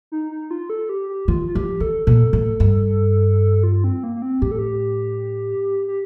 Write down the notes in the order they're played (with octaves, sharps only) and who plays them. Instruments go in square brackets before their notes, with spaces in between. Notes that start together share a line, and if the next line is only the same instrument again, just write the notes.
[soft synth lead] D#4
D#4
F4
A4
G4
G4
[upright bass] D#3 [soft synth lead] F4
[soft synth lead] F4
[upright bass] F3 [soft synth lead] G4
[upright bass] D#3 [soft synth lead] A4
[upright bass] A#2 [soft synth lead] A4
[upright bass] A2
G2
[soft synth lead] F4
C4
A#3
A#3
C4
[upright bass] A2 [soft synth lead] G4
[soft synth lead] A4
G4
G4